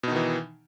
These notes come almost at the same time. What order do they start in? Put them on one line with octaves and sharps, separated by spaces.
B2 D#4 D#3 E3